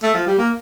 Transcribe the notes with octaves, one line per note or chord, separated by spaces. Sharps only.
A3
F3
G3
A#3